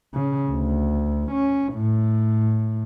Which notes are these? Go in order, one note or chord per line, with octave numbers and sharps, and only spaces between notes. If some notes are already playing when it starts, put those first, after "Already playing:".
C#3
D2
C#4
A2